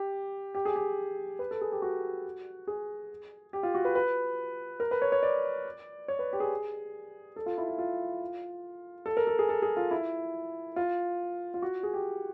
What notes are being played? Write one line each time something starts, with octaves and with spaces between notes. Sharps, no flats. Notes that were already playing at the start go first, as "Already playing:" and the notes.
Already playing: G4
G4
G#4
G4
B4
A4
G#4
G4
F#4
G#4
G4
F4
F#4
B4
B4
A#4
B4
C#5
C#5
D5
C#5
B4
G4
G#4
A4
F4
E4
F4
F4
A4
A#4
A4
G#4
A4
G#4
F4
E4
F4
F4
F#4
G#4
G4